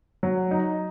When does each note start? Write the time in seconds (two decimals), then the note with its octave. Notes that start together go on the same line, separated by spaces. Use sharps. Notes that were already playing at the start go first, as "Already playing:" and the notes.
0.23 F#3
0.51 D#4